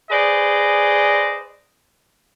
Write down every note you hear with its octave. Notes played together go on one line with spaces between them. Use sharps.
G#4 B4 C5 D5 D#5